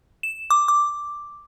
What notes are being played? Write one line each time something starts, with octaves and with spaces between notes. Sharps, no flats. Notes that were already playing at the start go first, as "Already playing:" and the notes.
E7
D6
D6